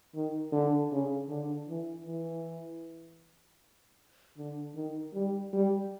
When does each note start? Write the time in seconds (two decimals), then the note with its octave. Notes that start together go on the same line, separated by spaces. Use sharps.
0.15 D#3
0.52 D3
0.92 C#3
1.29 D3
1.68 E3
2.06 E3
4.37 D3
4.75 D#3
5.14 G3
5.53 G3